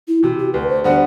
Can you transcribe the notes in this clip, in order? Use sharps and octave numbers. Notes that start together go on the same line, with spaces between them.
E4
C3 E3 F#4
G4
D2 B4
C5
D3 G3 B3 F#4 C5